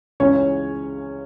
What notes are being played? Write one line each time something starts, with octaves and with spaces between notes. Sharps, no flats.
C#2 C#3 E3 C#4 C#5